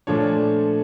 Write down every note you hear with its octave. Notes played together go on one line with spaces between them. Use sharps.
A#2 F3 A3 D4 C#5